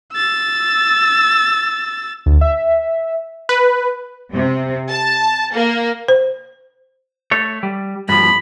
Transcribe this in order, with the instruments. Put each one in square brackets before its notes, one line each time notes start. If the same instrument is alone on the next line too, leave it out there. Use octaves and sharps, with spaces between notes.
[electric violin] E6 A6
[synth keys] D2
E5
[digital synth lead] B4
[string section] C3
A5
A#3
[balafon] C5
[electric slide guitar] A3 C#5
G3
[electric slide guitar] G2 F3 [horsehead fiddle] B5